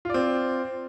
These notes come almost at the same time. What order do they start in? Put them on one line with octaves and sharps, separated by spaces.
F4 D5 C4